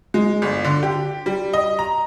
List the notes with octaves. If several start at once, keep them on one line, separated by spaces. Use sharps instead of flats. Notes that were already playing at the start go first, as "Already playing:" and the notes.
G#3
G1
D3
G4
G3
D#5
A#5